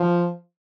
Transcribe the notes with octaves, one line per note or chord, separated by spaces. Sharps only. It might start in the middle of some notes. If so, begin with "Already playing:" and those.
Already playing: F3